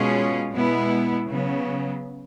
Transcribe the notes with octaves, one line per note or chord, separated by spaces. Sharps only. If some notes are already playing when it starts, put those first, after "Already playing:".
Already playing: B2 G#3 C#4 F4 G#4
B2 G#3 B3 E4
C#3 F#3 B3